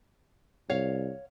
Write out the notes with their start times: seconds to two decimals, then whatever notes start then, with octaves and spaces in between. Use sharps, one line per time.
0.70 C2 C#5 F5